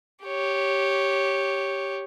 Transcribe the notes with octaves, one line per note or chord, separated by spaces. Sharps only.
G4 C#5